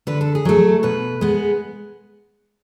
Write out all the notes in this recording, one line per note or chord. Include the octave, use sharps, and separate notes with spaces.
D3 B4
A4
G#4
F#3 A3 A4
B2 B4
G#3 B3